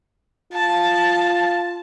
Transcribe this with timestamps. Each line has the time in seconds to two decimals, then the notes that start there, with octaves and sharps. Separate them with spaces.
0.53 F4 A5